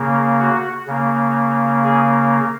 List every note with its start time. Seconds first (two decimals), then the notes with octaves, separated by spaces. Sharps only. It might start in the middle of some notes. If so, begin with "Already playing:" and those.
Already playing: C#3 A#3
0.40 F#4
0.87 C#3 A#3
1.84 G#4